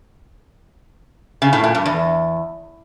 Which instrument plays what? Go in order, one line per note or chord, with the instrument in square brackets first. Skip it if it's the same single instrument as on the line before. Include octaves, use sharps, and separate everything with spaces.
[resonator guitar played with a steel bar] C#3
A2
A#2
G2
E2